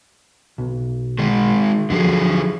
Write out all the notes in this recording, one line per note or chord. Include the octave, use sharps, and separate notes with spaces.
B1
D#3 G#3
D#2 D3 F3 F#3 G4 G#4